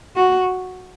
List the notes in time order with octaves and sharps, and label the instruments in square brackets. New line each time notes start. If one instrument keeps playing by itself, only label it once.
[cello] F#4